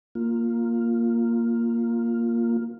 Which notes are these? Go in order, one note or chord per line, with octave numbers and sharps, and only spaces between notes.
A#3 F4